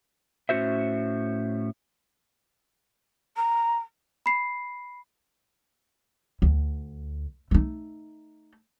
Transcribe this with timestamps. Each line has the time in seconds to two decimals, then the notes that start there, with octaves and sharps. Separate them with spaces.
0.49 A2 C#4 F4 F#4 C5 E5
3.36 A#5
4.26 B5 C7
6.42 D2
7.51 A3 D#4